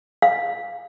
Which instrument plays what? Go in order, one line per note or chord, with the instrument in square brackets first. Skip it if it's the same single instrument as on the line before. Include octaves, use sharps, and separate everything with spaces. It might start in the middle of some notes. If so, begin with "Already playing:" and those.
[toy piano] F5